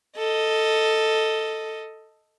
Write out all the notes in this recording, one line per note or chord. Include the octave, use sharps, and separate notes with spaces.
A4 D#5